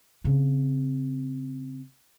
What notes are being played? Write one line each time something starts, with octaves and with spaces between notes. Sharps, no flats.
C#3 C4